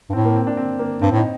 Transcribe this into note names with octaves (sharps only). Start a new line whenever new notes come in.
G2
A2 C4
A#3
C4
D4
C4
A#3
G2 C4
A2 D#4